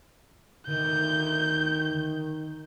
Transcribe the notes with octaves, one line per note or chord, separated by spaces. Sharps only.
D2 D#3 G6